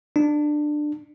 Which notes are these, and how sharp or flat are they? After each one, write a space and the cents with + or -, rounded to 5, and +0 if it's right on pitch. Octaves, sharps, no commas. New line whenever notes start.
D4 +20